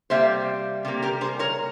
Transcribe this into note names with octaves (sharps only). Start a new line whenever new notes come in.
C3 G3 A#3 C5 E5
C3 G3 A#3
G4 A#4
G#4 C5
A#4 C#5